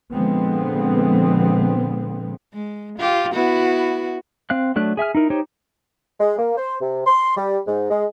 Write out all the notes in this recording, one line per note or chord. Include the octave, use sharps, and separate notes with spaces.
A#2 D3 F3 G#3 B3 C4
G#3
F4 G4
B3 E4 F#4
C4 F5 F#6
F#3 A3 D4 F#6
G#4 E5 G#5 F6
D#4 E4 A#4
D#4 G4 C5 C#5
G#3
A#3
C5
C3
C6
G3
G#2
G#3